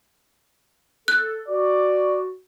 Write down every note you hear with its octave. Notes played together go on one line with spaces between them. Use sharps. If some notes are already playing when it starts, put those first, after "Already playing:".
A4 F#6
F#4 D5